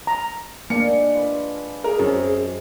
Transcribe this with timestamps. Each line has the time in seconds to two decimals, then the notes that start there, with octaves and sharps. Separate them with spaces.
0.07 A#5
0.70 G#3 A#3 D4 C#7
1.15 F4 B4
1.84 G#4 A#4
1.99 F#2 C4